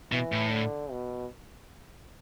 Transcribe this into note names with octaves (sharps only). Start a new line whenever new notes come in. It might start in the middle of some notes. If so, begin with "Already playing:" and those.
B2 E3
A2
D3
B2